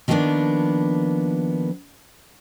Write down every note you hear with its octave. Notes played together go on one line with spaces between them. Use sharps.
D#3 F3 G3 A#3 B3 D4